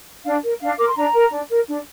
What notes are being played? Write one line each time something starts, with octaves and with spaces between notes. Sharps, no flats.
D4 F5
A#4
D4 F5
A#4 D6
C6
D4 A#5
A#4
D4
A#4
D4